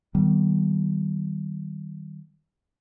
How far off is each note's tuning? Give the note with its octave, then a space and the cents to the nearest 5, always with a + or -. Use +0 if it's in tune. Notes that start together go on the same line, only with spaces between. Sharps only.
D#3 +0 G3 -30 B3 -5